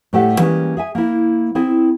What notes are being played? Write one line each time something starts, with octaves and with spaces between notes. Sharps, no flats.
A2 G3 A3 G4 A4 F#5
E3 G3 G#3 A#3 C4 C#4
G#4 E5 G#5
A#3 E4
C4 E4 G#4